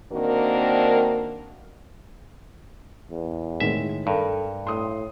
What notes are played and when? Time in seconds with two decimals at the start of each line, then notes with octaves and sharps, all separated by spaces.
0.12 D#3 A#3 C4 D4 F#4 A#4
3.11 E2
3.60 A2 D#3 G#3 E5
4.07 G2 A4 A#4
4.67 A2 C6 D#6